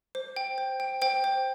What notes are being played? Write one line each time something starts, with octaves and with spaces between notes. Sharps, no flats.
C5
G5
C5
G5
C5 G5
C5